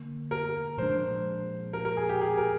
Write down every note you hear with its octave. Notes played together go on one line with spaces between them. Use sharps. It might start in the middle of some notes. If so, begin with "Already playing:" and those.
Already playing: D3 A#3
A#4
A#2 F3 G#3 D4 C5
A#4
A#4
G#4
G4
G#4
A#4